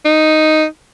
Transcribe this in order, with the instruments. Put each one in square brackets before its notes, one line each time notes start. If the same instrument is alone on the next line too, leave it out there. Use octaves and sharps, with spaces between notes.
[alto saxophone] D#4